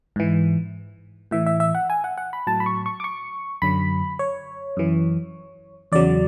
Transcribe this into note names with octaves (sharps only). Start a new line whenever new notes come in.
G#2 E3
A2 E3 E5
E5
E5
F#5
G#5
F#5
F#5
B5
A2 F#3 A5
B5
C#6
C#6
D6
C#6
F#2 D3 F#3 B5
C#5
F#2 E3
E2 C#3 F#3 D5